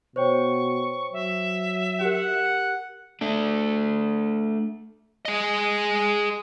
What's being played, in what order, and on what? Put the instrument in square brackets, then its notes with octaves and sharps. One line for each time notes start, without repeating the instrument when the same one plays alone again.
[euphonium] B2 [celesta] C5 C#5 G5 [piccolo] C#6
[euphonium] F#3 [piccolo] E5
[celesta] G4 A#4 [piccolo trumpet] F#5
[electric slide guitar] A3 D4
[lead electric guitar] G#4 D#5